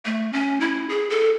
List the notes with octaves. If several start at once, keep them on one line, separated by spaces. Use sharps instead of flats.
A3
C#4
E4
G#4
A4